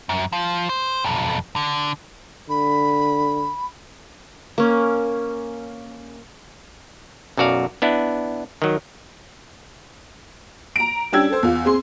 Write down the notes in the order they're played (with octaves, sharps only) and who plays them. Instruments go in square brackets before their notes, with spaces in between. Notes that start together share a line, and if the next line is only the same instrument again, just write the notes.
[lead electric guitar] F#2
F3
C5
B1 F2
D3
[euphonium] D3 [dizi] B5
[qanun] A#3 C#4
[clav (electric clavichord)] B1 F#2 F#4 D5 F5
B3 D4 E4
D#3 F#3
[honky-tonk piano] A#5 D7
G3 C#4 D4 G5 E6 G#6
A4 C5
E2 F4
C4 G#4 C6